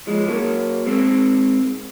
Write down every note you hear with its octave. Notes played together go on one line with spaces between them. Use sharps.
F3 G#3
F#3 A#3
G#3 C4